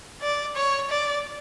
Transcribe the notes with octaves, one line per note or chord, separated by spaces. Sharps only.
D5
C#5
D5